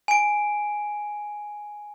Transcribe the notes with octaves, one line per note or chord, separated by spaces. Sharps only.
G#5 D7